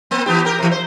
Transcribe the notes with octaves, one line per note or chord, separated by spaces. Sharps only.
A#3 C4
E3 B3 G4
G4 A#4
C3 E3
C5